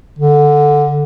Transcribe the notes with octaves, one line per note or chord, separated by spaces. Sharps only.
D3